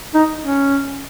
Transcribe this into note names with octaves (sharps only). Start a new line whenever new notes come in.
D#4
C#4